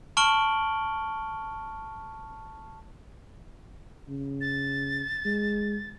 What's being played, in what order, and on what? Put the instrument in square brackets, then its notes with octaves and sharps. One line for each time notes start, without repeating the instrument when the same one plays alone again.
[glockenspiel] A5 C#6 F6 D7 F#7 G7
[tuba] C#3
[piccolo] A6
[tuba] G#3